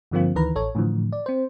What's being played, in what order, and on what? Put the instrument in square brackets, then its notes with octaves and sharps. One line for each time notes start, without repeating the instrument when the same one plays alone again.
[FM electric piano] G2 D3 F3 A#3 C4 F4
D2 D#3 E3 B4 A#5
A1 A4 C#5
A2 D3 E3 F3
D5
C4 C5